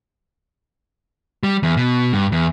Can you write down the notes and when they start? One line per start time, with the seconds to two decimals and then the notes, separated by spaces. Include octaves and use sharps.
1.43 G3
1.63 E2
1.77 B2
2.13 G2
2.32 E2